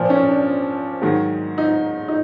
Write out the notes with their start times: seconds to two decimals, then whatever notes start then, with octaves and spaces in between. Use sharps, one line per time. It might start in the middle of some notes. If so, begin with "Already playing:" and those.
Already playing: A#2 F3
0.10 C#4
0.29 D4
1.02 G#2 D#3 F#3
1.58 D#4
2.08 D#4